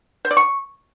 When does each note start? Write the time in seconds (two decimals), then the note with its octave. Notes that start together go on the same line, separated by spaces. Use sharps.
0.25 C5
0.31 D5
0.37 C#6